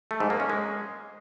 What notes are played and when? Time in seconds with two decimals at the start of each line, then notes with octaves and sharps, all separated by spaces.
0.11 A3
0.20 G#2
0.30 A#3
0.40 C#4
0.50 G#3